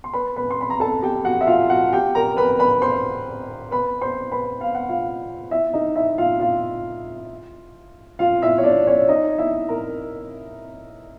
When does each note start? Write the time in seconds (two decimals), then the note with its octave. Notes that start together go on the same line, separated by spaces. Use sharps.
0.04 C6
0.14 B4 B5
0.36 B4 B5
0.51 C6
0.61 B5
0.70 A#5
0.80 A4 A5
1.02 G4 G5
1.25 F#4 F#5
1.41 E5
1.47 F4 F5
1.70 F#4 F#5
1.93 G4 G5
2.15 A#4 A#5
2.37 B4 B5
2.59 B4 B5
2.82 C5 C6
3.71 B4 B5
4.01 C5 C6
4.32 B4 B5
4.61 F5
4.75 F#5
4.89 F4 F5
5.51 E4 E5
5.73 D#4 D#5
5.96 E4 E5
6.18 F4 F5
6.40 F4 F5
8.19 F4 F5
8.42 E4 E5
8.58 C#5
8.64 D4 D5
8.87 C#4 C#5
9.08 D#4 D#5
9.38 E4 E5
9.69 A#4 A#5